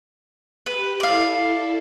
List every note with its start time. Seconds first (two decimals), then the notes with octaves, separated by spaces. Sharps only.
0.66 G4 B4
1.00 E4 A4 D5 F5